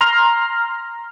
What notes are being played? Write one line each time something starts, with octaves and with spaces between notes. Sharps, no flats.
A#5 C6 F6